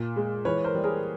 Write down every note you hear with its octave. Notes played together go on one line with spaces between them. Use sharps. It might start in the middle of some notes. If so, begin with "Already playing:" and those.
Already playing: A#2
G#3
E3 B4 C#5
A#4 C5
G3
G#4 A#4